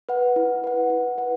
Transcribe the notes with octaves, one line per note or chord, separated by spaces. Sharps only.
B4 F#5
E4
B4 F#5
E4
B4 F#5